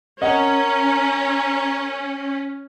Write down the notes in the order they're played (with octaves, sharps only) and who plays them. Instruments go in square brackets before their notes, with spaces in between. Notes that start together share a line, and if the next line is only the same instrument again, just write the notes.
[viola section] C#4 [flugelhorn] A#4 [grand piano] D#5 F#5